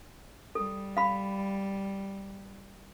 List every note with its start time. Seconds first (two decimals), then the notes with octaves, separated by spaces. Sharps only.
0.55 G3 A4
0.97 F5 B5